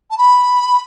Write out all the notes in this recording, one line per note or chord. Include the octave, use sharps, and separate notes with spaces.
A5
B5